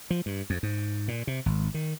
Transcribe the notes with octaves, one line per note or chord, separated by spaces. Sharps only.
F3
G2
F2
G#2
A#2
C3
G#1
D#3